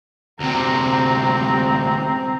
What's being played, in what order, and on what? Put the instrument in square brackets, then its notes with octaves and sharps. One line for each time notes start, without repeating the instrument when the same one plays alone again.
[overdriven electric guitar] D2 C3 [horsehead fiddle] C4 A#5